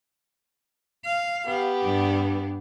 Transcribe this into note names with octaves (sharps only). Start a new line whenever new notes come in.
F5
B3 G4
G2 D4